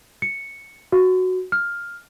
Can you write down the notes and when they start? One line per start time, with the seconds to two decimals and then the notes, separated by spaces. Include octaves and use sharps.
0.22 C#7
0.92 F#4
1.52 F6